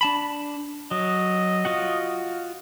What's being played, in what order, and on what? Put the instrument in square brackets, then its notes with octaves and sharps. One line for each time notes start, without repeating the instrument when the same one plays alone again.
[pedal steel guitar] D4 A5 B5
[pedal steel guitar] F#3 [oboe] D#5
[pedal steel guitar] F4 F#4 F#5